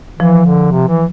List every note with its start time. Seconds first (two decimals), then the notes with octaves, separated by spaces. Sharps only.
0.19 E3 F3
0.46 D3
0.71 C3
0.88 E3